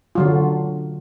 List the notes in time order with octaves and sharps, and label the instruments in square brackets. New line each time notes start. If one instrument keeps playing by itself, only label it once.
[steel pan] D3 F#3 F4